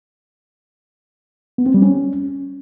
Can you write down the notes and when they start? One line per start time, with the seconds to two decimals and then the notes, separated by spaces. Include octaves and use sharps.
1.58 B3
1.66 C4
1.74 G3
1.82 C#4